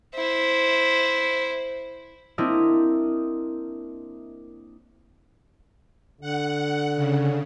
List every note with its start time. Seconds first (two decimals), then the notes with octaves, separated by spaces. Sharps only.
0.16 E4 C5
2.38 A#3 C4 D4 E4 A#4 D#5
6.21 D3 F#5
6.96 C#3